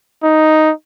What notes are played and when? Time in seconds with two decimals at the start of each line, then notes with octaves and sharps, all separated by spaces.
0.24 D#4